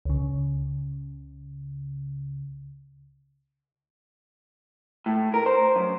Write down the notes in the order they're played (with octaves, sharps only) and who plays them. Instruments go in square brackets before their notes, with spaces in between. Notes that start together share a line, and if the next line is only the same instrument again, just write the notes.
[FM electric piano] C#2 C#3
[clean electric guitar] A2
A#4
C5
F#2